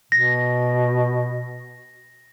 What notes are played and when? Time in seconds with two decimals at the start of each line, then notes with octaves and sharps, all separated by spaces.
0.12 B2 A#6